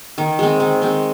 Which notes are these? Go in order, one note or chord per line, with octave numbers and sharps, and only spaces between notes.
D#3
G#3 C4
D#3
G#3 C4